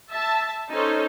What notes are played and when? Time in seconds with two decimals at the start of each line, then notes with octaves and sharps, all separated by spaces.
0.11 E5 A5
0.70 C#4 D#4 A4 C5 C#5